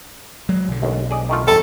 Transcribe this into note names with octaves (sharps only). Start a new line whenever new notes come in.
F#3 G#3
B1 D3
A1 D#2
G#4 D5 D#5
D#3 A3 F4
E2 G2 C3 G3 A4